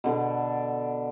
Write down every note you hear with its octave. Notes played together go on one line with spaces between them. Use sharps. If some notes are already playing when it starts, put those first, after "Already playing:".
B2 D3 D4 A4